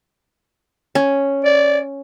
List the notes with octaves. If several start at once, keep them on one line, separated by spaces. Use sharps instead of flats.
C#4
D5